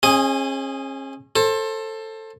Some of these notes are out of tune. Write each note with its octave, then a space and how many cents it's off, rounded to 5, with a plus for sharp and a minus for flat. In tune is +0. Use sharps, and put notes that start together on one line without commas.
C#4 -40 G#4 +0 D#5 +0
A4 +10 C5 +30